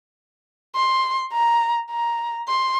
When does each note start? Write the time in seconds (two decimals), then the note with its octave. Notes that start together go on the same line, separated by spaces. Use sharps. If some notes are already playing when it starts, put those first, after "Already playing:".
0.75 C6
1.32 A#5
1.91 A#5
2.48 C6